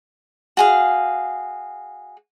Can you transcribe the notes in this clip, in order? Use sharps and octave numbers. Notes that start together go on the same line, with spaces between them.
F#4 G#4 F5